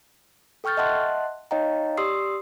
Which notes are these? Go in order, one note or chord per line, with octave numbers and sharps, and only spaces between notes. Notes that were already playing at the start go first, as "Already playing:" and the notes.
A4 G5 C#6 F6 G6 A6
D#5 E5 F#5 A5 C6 F#6
D#4 C#5 D#5 F5 G5 A#5
G4 D5 C6 D#6 E6 C7